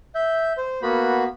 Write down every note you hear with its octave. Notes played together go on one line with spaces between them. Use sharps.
E5 G6
C5
A#3 B3 F#4 B5